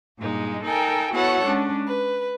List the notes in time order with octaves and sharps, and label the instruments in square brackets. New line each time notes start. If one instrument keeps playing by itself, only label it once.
[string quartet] G2 A#2 G#3 D#4
D#4 A4 A#4 G5 G#5
B3 E4 F#4 A4 C#5 F#5
G#3 C#4 D4
B4